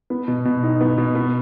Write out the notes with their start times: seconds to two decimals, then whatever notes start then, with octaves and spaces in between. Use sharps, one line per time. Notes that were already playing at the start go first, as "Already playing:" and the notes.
0.10 B3
0.28 B2
0.45 B2
0.63 D#4
0.81 B3
0.98 B2
1.15 B3